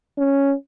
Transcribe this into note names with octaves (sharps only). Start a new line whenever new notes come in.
C#4